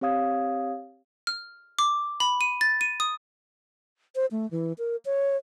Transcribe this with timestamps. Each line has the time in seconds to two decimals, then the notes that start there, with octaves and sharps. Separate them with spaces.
0.01 C4 G4 C#5 F5 D#6 G#6
1.27 F6
1.79 D6
2.20 B5
2.41 D#7
2.61 A6
2.81 D#7
3.00 D#6
4.15 C5
4.31 A3
4.51 E3
4.78 A#4
5.05 C#5